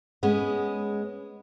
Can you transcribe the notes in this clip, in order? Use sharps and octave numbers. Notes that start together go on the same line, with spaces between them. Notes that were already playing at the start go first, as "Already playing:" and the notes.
G#3 B3 C#4